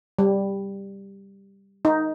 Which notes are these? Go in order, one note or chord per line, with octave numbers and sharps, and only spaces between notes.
G3
D#4